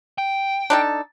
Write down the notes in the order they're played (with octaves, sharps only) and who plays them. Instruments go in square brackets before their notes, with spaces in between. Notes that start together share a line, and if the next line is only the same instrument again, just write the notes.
[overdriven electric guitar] G5
[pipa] D4 D#4 A4